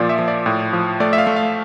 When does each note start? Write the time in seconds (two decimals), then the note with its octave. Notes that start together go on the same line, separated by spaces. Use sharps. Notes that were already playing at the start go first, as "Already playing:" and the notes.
Already playing: A#2 F3 D5
0.09 E5
0.19 F3
0.28 D5
0.46 A2
0.73 F3
1.00 A3 D5
1.13 E5
1.18 F5
1.27 A3
1.36 F5